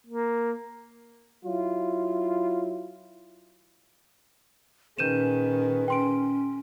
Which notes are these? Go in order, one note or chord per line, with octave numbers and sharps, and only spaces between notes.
A#3
F#3 E4 F4
A#2 D#3 C#4 G#4 B4 G6 D#7 E7
C#4 G5 C6 D7